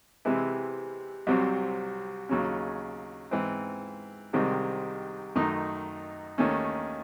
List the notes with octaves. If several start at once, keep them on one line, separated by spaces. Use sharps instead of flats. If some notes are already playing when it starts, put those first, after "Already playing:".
C3 E3 G#3 C4 E4
C2 C3 F#3 C4
D#2 C#3 F#3 C#4
G#2 E3 C4
C2 C3 D#3 G#3 C4
F#2 D#3 A3 D#4
D#2 D#3 A3 C#4